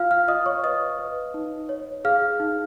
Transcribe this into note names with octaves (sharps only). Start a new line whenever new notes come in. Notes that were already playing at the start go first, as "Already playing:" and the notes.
Already playing: F4 F5 F6
F5 F6
F4 D#5 D#6
C#5 C#6
B4 D#5 D#6
B4
D#4
C#5
G#4 F5 F6
D#4